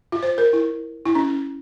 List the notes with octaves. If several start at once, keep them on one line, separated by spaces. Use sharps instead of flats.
F4
C5
A#4
E4
E4
C#4